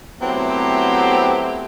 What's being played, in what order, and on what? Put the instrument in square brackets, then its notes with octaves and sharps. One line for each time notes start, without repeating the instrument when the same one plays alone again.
[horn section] F#3 A3 B3 C4 E4 G4